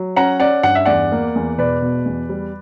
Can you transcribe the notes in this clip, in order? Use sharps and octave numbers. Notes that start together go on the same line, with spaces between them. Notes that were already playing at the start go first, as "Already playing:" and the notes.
Already playing: F#3
C#4 F#5 A#5
C#4 D5 F#5
G2 F#5
E5
E2 D5 F#5
A#3
E2
E1 B4 D5
B2
E2
G3